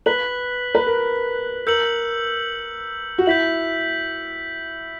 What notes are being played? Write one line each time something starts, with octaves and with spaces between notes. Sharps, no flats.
B4 F#6 B6 F#7
B4
A#4
A#4 E6 G6 C#7 F#7
F#4
E4 G6 B6 F#7